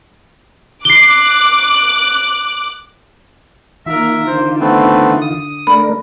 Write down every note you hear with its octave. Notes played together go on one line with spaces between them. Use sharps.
D6 F#6 C7 G7
D#3 A#3 F4 A#4 E5
D3 C5
A3 B3 C4
D#6
A3 D4 A#4 B5